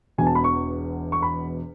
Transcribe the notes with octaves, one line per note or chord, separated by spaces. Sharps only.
E1 E2 B2 G#5
A5
B5
C#6
C#6
B5